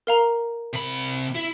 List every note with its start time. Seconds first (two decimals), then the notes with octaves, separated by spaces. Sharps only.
0.07 A#4 F5 A#5
0.73 C3 B5
1.35 E4